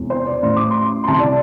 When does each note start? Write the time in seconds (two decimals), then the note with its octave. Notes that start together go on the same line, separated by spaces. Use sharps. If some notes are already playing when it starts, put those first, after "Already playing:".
Already playing: E1 E2 C3
0.10 C5
0.27 D5
0.42 A1 A2 E3 C6
0.57 D6
0.71 C6
1.04 C6
1.08 C2 C3 E3 A5
1.20 D5